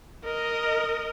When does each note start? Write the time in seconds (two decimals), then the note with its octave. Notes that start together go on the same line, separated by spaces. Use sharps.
0.25 A#4 D#5